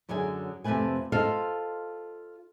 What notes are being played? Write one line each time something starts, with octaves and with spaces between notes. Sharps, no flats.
F#2 D3 F#3 G#4 G#5
F2 C3 F#3 A3 B4 G#5
F4 A4 C5 D#5 F5